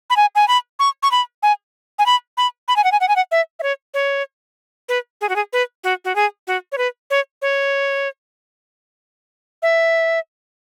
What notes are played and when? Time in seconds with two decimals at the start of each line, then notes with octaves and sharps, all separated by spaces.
0.10 B5
0.17 G#5
0.35 G#5
0.48 B5
0.79 C#6
1.03 C#6
1.12 B5
1.43 G#5
1.99 G#5
2.06 B5
2.37 B5
2.68 B5
2.76 G#5
2.84 F#5
2.92 G#5
3.01 F#5
3.08 G#5
3.16 F#5
3.31 E5
3.59 E5
3.63 C#5
3.94 C#5
4.89 B4
5.21 G#4
5.29 F#4
5.36 G#4
5.53 B4
5.84 F#4
6.05 F#4
6.16 G#4
6.47 F#4
6.72 C#5
6.78 B4
7.10 C#5
7.42 C#5
9.62 E5